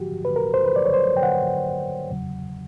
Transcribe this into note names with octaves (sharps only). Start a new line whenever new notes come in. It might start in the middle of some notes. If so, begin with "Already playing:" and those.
Already playing: G#2 F3 F#4 G4
B4
A#4
C5
B4
D5
C#5
C5
G5
F#5
E2 C#3 F#3